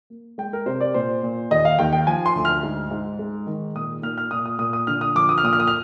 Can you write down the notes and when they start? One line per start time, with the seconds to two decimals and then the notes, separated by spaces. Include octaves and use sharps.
0.10 A#3
0.38 G#3 G5
0.53 A#4
0.66 C3 C5
0.81 D5
0.94 A#2 C5
1.23 A#2
1.51 D#2 D#5
1.65 F5
1.79 D#2 G5
1.93 G5
2.07 F3 G#5
2.26 C6
2.35 D2
2.45 F6
2.63 G#2
2.91 G#2
3.19 G#3
3.47 D#3
3.75 A#2 D#6
4.03 A#2 F6
4.18 F6
4.31 A#2 D#6
4.46 D#6
4.59 A#2 D#6
4.73 D#6
4.87 D3 F6
5.01 D#6
5.15 F3 D6
5.29 D#6
5.38 F6
5.43 A#2 D#6
5.53 F6
5.60 D#6
5.67 F6